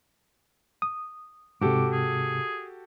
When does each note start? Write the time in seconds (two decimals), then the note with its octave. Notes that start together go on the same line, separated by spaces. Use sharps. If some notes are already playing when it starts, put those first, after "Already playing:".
0.82 D#6
1.61 G#2 C3 F#4 G4 A4 D6
1.92 G#4